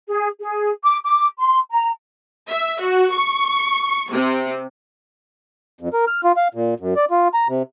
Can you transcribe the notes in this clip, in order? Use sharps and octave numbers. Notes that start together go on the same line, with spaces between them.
G#4
G#4
D6
D6
C6
A#5
E5
F#4
C#6
C3
F2
A#4
F6
F4
F5
A#2
F#2
D5
F4
A#5
C3